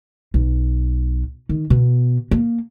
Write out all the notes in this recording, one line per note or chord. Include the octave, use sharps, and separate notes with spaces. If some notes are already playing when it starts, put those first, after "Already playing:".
B1
D#3
B2
A#3